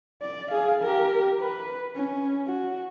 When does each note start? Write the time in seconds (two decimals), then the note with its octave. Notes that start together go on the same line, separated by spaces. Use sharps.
0.22 D5
0.51 G#4 F5
0.82 G4 A#4
1.40 B4
1.96 C#4
2.47 F#4